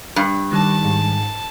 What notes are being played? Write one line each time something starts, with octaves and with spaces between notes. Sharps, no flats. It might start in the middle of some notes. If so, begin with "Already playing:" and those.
G2
D#3 G3 A5
G#2